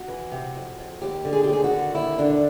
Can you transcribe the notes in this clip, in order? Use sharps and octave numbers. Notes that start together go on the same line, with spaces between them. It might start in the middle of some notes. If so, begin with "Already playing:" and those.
Already playing: F#4
E3
C3
F2
F2
D#2 G4
D3
G#4
G4
D#2 G#4
F#4
D3
D#2 E4
D3 D4